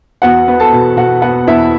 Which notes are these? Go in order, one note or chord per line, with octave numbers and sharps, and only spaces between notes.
E2 F#4 F#5
B3
A4 A5
B2
B2 F#4 F#5
B3 F#4 F#5
E2 E4 E5